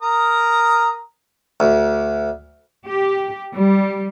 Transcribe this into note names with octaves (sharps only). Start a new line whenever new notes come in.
A#4 A#5 D#6
D2
G4
G3